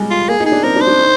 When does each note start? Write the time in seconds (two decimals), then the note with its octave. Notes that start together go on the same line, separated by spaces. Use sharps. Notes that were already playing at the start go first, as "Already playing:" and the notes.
Already playing: G3 G#3
0.11 F4
0.28 A#3 G#4
0.40 D#4
0.46 G#4
0.52 D4
0.64 C4 A#4
0.76 D4
0.81 C5
0.87 D4
0.99 D#4